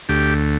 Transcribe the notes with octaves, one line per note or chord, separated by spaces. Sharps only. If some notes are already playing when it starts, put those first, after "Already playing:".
D2 G4